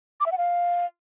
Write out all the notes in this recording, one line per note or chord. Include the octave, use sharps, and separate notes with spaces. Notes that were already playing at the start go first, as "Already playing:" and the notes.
D6
E5
F#5
F5